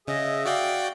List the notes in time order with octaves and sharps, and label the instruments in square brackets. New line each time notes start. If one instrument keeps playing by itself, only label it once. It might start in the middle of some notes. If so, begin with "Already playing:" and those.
[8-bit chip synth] C#3 [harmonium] G#4 E5 [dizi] D#5
[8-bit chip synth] F#4 D5 G5 [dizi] F5